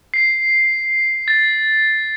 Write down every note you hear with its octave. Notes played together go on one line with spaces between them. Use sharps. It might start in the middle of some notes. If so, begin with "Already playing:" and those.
C7
A6